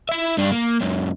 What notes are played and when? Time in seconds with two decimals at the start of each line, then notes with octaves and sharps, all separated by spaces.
0.09 E4 E5
0.38 G2 D4
0.52 A#3
0.81 C#2 F#2